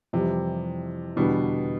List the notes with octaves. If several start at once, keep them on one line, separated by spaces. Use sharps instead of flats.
F2 C3 E3 G3
E2 B2 D3 G3 B3 D4